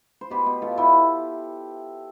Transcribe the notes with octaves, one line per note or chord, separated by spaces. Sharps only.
C5
B2 G4 B4
B2
B2 F4 A4
B2 E4 G4